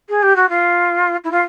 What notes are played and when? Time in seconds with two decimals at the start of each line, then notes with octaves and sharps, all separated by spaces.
0.09 G#4
0.23 G4
0.36 F#4
0.49 F4
1.24 E4
1.31 F4